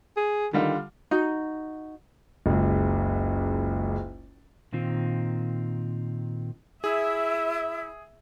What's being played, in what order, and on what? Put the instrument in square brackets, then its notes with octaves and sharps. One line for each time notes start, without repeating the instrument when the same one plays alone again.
[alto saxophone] G#4
[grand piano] D3 G3 F4 [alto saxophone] D#3
[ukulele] D#4 F#4
[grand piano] F#1 C#2
[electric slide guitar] A#2 D#3 C4 F4
[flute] E4 [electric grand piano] G#4 [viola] E5